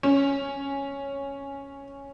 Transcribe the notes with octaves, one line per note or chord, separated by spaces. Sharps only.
C#4